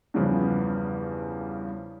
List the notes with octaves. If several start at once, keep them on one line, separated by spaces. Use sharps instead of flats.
E2 G2 C#3 F3 B3